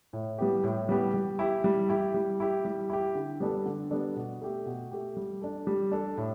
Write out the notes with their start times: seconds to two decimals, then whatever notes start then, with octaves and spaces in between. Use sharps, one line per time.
0.13 A2
0.38 G3 B3 G4
0.64 A2
0.89 G3 B3 G4
1.14 G3
1.39 E4 G4
1.64 G3
1.89 E4 G4
2.14 G3
2.40 E4 G4
2.65 G3
2.90 E4 G4
3.15 D3
3.40 G3 B3 D4 A4
3.66 D3
3.91 G3 B3 D4 A4
4.16 B2
4.41 A3 G4
4.66 B2
4.92 A3 G4
5.17 G3
5.42 D4 A4
5.67 G3
5.92 D4 A4
6.17 A2